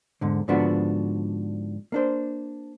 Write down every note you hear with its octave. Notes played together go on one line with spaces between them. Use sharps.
E2 G#2 D3
G#2 D3 F3 B3 D4 F#4
A#3 D4 C5